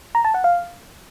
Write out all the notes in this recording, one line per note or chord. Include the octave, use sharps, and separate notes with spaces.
A#5
A5
F#5
F5